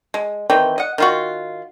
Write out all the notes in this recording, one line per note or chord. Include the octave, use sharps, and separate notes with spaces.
G#3
D#3 E3 C4 G5
D#5 F#5
D#3 F4 F#4